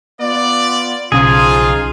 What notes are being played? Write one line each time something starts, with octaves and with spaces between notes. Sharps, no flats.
B3 F4 D5
B1 C#3 F3 D#4 F4 G#4